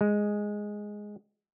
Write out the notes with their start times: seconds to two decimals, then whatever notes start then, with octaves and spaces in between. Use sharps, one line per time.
0.01 G#3